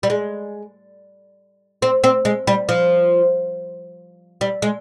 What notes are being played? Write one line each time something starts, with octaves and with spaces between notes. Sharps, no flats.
G3
G#3
C4
C4
G#3
G3
F3
G3
G#3